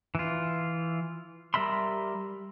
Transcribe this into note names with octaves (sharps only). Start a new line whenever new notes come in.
E3 F4
G3 A#4 E5 B5 C6